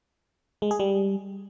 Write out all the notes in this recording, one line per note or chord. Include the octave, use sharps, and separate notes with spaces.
G#3
G#4
G3